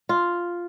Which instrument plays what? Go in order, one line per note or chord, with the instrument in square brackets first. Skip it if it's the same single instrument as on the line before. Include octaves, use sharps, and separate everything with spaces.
[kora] F4